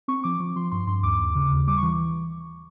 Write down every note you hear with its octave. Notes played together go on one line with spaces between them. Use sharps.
C4 C#6
F3 D6
F3
F3 C6
G2 C6
G2 C6
D#2 D6
D#2
C#3
D#2
G3 D6
C#6
E3